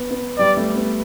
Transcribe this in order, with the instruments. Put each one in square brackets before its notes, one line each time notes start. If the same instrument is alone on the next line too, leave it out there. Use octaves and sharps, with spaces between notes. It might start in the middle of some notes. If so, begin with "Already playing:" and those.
Already playing: [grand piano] B3
B3
[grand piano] G3 [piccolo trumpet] D5
[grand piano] A3
B3